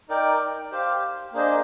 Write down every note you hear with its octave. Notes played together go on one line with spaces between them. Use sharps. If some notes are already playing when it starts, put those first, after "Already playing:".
D#4 A#4 D5 G5
G4 C5 F5
A#3 D4 G#4 C5 D#5